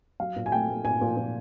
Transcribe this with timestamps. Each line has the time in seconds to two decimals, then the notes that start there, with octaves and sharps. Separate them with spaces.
0.20 F#3 F5
0.36 A#2
0.46 G#5
0.52 A3 G5
0.69 A3
0.85 A#2 G#5
1.01 A#2
1.17 A#2